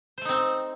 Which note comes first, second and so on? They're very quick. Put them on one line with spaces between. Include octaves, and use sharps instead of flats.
C5 A3 D#4 C4